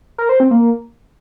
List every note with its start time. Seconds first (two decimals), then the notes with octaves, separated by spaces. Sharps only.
0.18 A#4
0.29 C5
0.40 C4
0.51 A#3